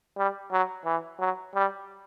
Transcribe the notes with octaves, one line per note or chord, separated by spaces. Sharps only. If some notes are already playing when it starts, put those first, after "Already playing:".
G3
F#3
E3
F#3
G3